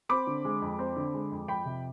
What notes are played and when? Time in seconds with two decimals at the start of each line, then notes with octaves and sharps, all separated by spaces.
0.09 C4 B5 D6
0.27 D3
0.45 G#3
0.62 F2
0.79 C4
0.96 D3
1.14 G#3
1.31 F2
1.48 F2 G5 B5
1.65 C3